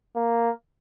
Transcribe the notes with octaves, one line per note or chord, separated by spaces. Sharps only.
A#3